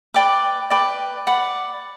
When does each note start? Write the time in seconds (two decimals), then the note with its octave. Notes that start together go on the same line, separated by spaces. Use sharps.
0.14 B4 D5 G5 D6
0.70 B4 D5 G5 D6
1.27 D5 F#5 B5